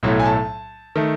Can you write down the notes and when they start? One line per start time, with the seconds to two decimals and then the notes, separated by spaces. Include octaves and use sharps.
0.03 B1 A2 F#3 A3
0.19 G#5
0.25 A5
0.96 D#3 A3